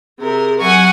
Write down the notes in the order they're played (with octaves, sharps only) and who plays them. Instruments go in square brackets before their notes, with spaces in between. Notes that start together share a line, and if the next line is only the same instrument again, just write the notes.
[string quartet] C3 A#4 [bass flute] G#4
[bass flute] F#3 [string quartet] F#5 G#5 C#6